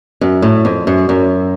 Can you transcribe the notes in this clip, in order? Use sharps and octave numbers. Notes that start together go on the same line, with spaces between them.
F#2
A2
F2
F#2
F#2